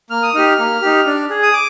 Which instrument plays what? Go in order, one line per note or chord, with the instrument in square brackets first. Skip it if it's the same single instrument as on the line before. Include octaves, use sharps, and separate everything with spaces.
[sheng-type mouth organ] A#3 F6
D#6
D#4 G4 F6
A#3
D#4 G4
D4
G#4
D#6
D6